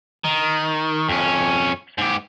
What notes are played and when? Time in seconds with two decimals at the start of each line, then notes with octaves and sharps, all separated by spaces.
0.24 D#3
1.09 F2 C#4
1.98 G#2 G4